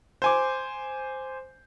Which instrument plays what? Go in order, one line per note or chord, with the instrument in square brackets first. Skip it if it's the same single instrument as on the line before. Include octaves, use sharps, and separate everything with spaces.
[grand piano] C5 G#5 D6